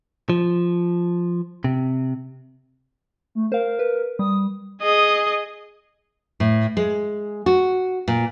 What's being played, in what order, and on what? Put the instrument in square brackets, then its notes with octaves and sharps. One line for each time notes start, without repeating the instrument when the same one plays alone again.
[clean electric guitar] F3
C3
[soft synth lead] A3
[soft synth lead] A#4 [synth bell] C5 F5
[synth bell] B4
[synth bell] G3 [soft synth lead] D#6
[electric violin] G#4 D#5
[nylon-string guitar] A2
G#3
F#4
A#2